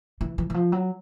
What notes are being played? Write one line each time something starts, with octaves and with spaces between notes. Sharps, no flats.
E3
E3
E3
F3
F#3